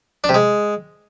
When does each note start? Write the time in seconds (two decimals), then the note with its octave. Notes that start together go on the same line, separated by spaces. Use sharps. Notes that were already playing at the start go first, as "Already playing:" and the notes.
0.24 D4
0.29 C3
0.34 G#3